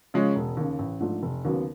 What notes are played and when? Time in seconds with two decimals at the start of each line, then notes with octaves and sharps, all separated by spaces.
0.14 C#3 F3 G#3 C#4
0.35 E1
0.57 D#2 C#3
0.79 A1
1.00 G#2 F3 A3 D4
1.23 F1
1.45 D#2 C#3 F#3 B3